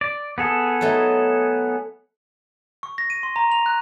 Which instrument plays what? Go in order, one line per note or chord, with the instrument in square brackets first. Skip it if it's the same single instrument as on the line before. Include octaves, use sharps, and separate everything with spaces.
[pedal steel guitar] D5
B3 G#4 A4
[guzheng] F#3 A3 D#4
[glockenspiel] C#6
A#6
D#7
C6
A#5
F7
F#6